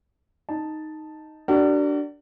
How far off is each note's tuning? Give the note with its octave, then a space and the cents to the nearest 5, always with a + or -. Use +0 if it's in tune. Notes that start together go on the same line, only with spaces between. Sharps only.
D#4 +0 A5 +0
D4 -5 F#4 +40 A#4 -45